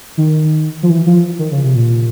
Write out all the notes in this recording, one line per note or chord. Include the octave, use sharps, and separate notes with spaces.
D#3
F3
E3
F3
D#3
C#3
C3
A#2